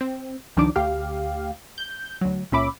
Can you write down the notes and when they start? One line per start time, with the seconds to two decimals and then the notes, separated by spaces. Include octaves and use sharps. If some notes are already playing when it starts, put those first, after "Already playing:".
0.01 C4
0.57 C#2 D#3 F3 D4 D6
0.76 D2 G4 F5
1.78 G6
2.21 D2 F#3
2.52 C#2 A#2 C#4 E5 B5 D6